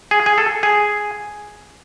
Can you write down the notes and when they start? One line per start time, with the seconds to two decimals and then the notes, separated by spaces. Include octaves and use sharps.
0.11 G#4
0.26 G#4
0.38 A4
0.63 G#4